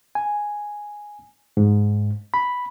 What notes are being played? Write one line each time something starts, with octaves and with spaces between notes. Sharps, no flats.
G#5
G#2
B5